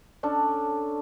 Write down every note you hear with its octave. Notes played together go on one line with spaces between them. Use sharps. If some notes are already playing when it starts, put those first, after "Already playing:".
C#4 D4 A4